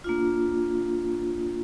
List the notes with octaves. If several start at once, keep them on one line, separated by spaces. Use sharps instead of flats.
A#3 D4 F4